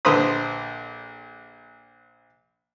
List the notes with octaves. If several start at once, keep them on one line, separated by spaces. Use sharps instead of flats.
A#1 D3 B4 C5 B5 D#6